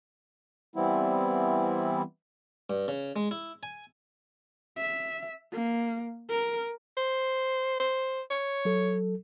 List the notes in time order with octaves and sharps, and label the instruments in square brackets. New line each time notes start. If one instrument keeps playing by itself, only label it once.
[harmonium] E3 G3 B3 C4 E4
[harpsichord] G2
C#3
G#3
E4
G#5
[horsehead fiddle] E5
A#3
A#4
[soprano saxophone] C5
C5
C#5
[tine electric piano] F#3 A4